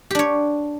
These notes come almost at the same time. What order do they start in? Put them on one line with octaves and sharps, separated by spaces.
G4 D4 C#5